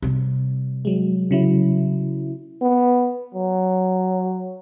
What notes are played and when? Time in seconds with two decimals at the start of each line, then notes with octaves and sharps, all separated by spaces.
0.02 C3 G3
0.85 F#3 G#3
1.31 C#3 F#3 E4
2.62 B3
3.35 F#3